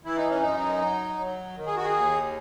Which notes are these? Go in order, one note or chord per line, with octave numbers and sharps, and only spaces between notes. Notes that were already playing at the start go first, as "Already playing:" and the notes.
E3 E4
D#4
C#4
F#2 D#4
F#3
F#3
D#3
G#4
F#4
G#4
D#2